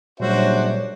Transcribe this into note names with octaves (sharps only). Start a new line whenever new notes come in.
F#1 A#2 G3 D4 F#4 C5 C#5 E5